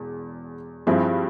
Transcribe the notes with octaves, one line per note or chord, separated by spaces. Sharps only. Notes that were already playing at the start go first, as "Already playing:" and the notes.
Already playing: E1 E2
G2 F3 C4 E4 G#4